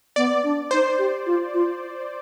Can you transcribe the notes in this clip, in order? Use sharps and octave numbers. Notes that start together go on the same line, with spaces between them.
B3 D5
D4
D#4 C5
G4
F4
F4